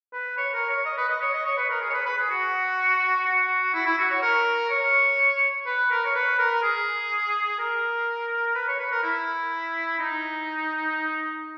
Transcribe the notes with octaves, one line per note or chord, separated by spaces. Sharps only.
B4
C#5
A#4
C#5
D#5
B4
D#5
C#5
D#5
C#5
B4
A#4
G#4
C#5
B4
B4
G#4
F#4
F#4
E4
E4
F#4
C#5
A#4
C#5
B4
A#4
C#5
B4
A#4
G#4
A#4
B4
C#5
B4
A#4
E4
D#4